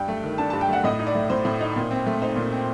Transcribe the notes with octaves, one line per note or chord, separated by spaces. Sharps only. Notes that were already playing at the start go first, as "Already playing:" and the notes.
Already playing: G2 G5
A3
D#3
D4 A5
G2 A5
G5
A3 F#5
A2 D#5
D#4
D5
A3
A2 C5
A2
D#4
A#2
C4
A3
D#4 C5
A#2
C4